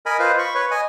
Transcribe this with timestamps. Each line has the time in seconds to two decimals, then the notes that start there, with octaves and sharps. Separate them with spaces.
0.06 A#4 D#5 G#5 B5
0.19 F4 B4 C5 D#5 F5
0.39 B5 C#6
0.55 B4 C#5
0.71 D#5 G#5